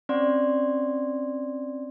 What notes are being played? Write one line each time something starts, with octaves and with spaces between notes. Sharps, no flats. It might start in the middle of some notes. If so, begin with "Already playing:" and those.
C4 C#4 D5 C6